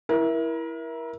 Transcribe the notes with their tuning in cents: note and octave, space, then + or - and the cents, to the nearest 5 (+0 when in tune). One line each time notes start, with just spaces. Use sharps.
E4 +0 A#4 +30